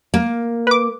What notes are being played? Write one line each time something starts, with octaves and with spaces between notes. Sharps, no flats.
A#3
B4 D6